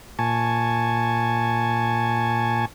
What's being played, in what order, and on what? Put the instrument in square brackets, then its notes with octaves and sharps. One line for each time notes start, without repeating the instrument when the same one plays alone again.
[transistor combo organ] A#2 G#5 A5 C#6